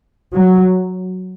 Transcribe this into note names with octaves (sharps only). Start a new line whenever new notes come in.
F#3